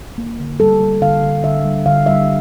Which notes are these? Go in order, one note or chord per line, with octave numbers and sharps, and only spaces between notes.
A#3
D3
G3 A4
G3
D3 F5
D3
D3 E5
G3
D3 F5
G3 E5